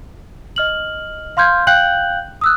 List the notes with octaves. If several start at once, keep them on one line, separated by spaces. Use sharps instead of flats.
D#5 F6 F#7
F5 C6 F6 G6 G#6
F5 G5 F#6 G6 F#7
D#6 E6 F#6